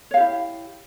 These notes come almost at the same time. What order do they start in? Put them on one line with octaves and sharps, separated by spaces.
C#5 F5 G4 E4